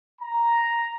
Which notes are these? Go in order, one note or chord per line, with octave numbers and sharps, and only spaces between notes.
A#5